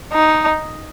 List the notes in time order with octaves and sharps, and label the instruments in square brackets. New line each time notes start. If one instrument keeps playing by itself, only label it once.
[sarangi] D#4